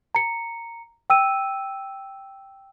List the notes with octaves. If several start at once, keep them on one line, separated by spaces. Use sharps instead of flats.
A#5 C#7
G5 E6 D#7